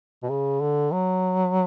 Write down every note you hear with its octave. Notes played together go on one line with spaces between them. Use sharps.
B2
C#3
D3
F#3